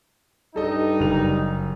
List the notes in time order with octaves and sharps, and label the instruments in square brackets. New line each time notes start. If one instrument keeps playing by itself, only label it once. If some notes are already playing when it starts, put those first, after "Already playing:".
[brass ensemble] G2 G3 D#4 [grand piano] A4 D#5
[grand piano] F#1 F7